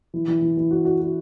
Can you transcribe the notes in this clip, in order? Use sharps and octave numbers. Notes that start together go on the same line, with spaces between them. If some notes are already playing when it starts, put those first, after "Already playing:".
E3
E3
E3
E3
F#4
F#4
F#4